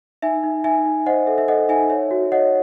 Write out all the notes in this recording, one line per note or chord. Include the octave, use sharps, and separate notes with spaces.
D#4 E5 G#5
D#4
D#4 E5 G#5
D#4
C5 D#5 F#5
A4 E5
E5
A4 D#5 F#5
D#4 E5 G#5
C#5 E5
F#4
C#5 D#5 F#5